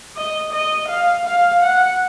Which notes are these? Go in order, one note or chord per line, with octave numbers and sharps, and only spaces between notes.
D#5
D#5
F5
F5
F#5